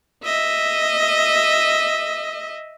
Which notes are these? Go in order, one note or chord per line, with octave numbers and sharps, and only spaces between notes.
D#5 E5